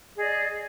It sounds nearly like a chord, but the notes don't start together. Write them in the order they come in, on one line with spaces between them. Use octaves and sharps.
G#4 D#5 D5